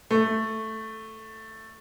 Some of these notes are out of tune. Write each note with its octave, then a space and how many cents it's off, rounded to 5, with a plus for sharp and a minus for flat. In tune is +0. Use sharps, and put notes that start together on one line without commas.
A3 +0